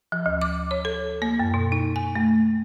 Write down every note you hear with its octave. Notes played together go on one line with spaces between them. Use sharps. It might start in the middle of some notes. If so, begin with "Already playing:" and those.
F3
D2
D6
C#5
A4
A#3
F#2
B2
D#4
G#5
A3